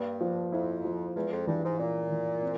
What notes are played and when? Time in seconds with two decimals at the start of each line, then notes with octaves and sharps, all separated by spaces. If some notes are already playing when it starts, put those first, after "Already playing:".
Already playing: G2 A#3
0.21 F3
0.52 F2 E4
0.84 F3
1.15 E2 G#3
1.31 F2
1.47 G2 E3
1.64 G#2
1.79 A#2 C#4
2.10 E3
2.42 C4